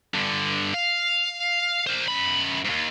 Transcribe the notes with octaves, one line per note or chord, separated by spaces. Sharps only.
G2 D3
F5
A#4 C5
F#2 B5
D#2 G#2